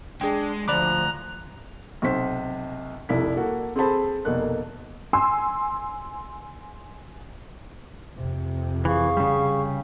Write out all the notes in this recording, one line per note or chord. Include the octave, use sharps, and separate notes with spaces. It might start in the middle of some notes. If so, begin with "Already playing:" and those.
G#3 D4 G#4 G5
D2 F3 D5 A#5 B5 D6 F#6
B1 C3 C5 B6
F1 C2 E4 D5 B6
A#3 F#4 A4
C4 G#4 A4 C5 A5 B5
F1 B2 A#3 A4 F#6
G#5 C6 E6
F2 C3
E3 G#4 F5 C#6
C#3 G3